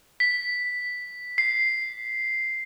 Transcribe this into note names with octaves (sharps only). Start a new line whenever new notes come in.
B6
C7